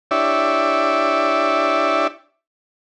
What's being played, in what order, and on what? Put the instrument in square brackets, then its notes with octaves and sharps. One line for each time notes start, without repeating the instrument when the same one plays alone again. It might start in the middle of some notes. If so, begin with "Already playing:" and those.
[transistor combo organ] D4 E4 G4 C#5 D5 E5